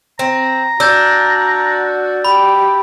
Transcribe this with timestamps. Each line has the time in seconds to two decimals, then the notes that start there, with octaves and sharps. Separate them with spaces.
0.19 C4 A#5
0.80 D4 F#4 E6 G6 A6
2.25 G4 B5